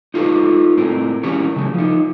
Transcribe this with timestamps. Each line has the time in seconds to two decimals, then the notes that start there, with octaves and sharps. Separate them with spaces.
0.14 D#4 F4 A4 B4 C5
0.77 A2 C4 A#4
1.23 E3 C#4 G4 A#4 C#5
1.56 C#3 F#3 A3
1.74 F3 D#4